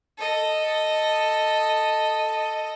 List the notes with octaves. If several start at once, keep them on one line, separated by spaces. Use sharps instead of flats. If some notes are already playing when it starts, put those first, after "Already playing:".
A4 D#5